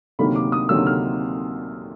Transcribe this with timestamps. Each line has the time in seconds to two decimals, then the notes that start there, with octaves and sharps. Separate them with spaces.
0.19 D2 C3 D#3 F#3 A#3 B5
0.35 D6
0.52 D#6
0.69 D2 C3 D#3 F#3 A#3 E6
0.87 F6